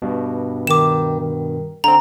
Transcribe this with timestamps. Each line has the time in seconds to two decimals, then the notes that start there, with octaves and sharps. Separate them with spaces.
0.02 G2 B2
0.67 D#3 D6 E7
1.20 D#3
1.84 D3 C4 A#5